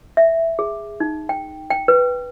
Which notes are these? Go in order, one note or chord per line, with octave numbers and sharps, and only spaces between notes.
E5
G#4
D#4
G5
G5
B4